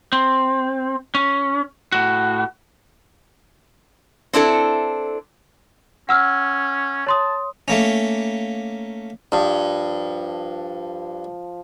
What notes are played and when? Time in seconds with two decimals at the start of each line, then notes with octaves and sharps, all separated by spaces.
0.12 C4
1.15 C#4
1.92 A2 F#4
4.33 C4 D4 E4 A4
6.09 C#4 F#5 E6 F6
7.07 C#5 A5 C6 D#6
7.68 A3 A#3 C#4
9.32 G2 F3